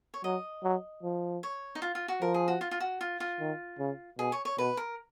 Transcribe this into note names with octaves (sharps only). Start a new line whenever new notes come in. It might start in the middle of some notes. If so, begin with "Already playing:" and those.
C#5
F#3 D#5
F#3
F3
C#5
D#4
F4
F4
F#4
F3 A#4
G#4
F#4
F4
F4
F#4
F4
F4
D#3
C#3
B2 G#4
C#5
C#5
B2 B4
A#4